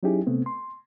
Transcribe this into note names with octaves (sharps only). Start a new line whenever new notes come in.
F#3 C#4 D#4 E4 G4 G#4
C3 A3 B3 C4
C6